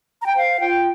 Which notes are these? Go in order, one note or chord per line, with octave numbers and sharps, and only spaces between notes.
A#5
G5
C5 F5
F4 G5